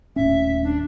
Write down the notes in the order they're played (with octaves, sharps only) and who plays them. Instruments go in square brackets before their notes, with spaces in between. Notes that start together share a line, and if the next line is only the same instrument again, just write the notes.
[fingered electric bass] D#1 A2 C#4 [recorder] E5
[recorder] D4